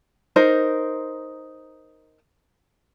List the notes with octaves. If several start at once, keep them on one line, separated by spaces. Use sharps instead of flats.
D#4 A#4 C5